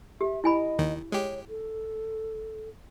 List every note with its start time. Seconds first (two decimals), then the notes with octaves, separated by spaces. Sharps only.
0.21 G4 E5
0.44 E4 D#5 G#5 B5
0.79 D#2 D#3
1.12 G#3 G4 C#5
1.49 A4